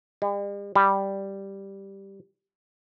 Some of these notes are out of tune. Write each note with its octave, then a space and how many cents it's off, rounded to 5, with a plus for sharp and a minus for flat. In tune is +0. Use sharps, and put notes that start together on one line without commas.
G3 +45
G3 +0